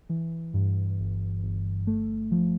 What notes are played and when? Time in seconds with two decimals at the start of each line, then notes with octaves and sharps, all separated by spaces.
0.09 E3
0.54 G2
0.99 G1
1.43 G1
1.87 A3
2.31 F3